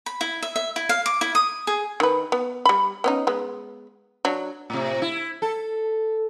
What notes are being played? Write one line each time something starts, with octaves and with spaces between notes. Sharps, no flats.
B5
E4
E5
E5
E4
F5
D6
E4
D#6
G#4
D#3 B4
B3
G3 B5
B3 C#4 D#4
G#3 B3
F#3 D4
A2 C3
E4
A4